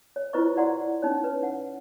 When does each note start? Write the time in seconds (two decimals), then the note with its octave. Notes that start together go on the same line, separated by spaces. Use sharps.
0.16 C#5
0.33 E4 F4 B4 C5 D#5 C#6
0.56 F#4 D5 F#5 A#5 C6
1.02 C#4 D#4 C#5
1.24 B4
1.43 F#5